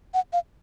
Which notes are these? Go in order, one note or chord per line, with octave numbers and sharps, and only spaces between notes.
F#5
F5